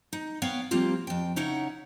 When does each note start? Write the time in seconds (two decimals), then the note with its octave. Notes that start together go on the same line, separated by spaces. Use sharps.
0.13 D#4
0.42 B3 C#5 F5 G5
0.71 F3 G3 A#3 C4 F4 G4
1.07 F2 G5
1.36 C#3 D#4 E4 C#5 F#5